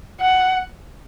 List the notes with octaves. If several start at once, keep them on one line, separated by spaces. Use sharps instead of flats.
F#5